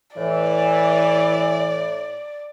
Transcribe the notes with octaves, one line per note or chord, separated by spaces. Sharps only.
A2 E3 D5